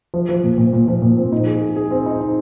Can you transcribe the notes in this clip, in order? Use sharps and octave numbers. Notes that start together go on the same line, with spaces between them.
F3
F3
A#2
A#2
A#2
F3
A#2
C4
D#4
G#4
G#4
G#4
C4
D#4
D#4